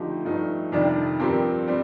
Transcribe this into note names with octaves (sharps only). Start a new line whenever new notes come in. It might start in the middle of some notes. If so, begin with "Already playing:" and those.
Already playing: D3 F3 A3 D#4 G4
G2 F3 A3 D#4
F2 C3 D#3 G3 D4
G2 F3 C4 G4 A#4
G3 C4